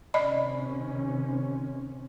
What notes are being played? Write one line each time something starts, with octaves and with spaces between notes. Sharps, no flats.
C3 D#3 C#4 D5 D#5 B5